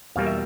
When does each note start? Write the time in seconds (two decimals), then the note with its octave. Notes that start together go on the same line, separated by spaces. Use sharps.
0.16 E2 B2 G3 A#3 F5
0.27 E5